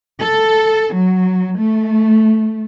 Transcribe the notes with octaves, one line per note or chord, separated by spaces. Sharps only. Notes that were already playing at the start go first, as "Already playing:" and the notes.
A4
F#3
A3